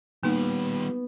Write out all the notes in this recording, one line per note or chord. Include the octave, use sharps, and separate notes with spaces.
D#3 G3 A#3 B3 D#4